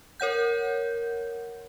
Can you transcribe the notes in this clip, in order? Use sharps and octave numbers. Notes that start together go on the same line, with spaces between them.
A#4 C#5 F#5 G6